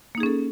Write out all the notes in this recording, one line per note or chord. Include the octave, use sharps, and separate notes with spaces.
A#3 C#4 D#4 G#4 A4